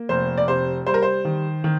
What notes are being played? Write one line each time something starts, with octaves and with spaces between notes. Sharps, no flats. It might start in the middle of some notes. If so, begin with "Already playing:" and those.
Already playing: A#3
F1 C5
D5
C3 C5
G3 C5
A#4
C5
D#3
D#3